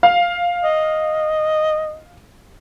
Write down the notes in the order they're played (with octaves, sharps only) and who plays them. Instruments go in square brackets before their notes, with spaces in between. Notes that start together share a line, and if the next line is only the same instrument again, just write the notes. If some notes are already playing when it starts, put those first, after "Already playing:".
[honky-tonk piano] F5
[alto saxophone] D#5